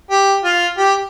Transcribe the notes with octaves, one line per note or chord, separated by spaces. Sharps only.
G4
F4
G4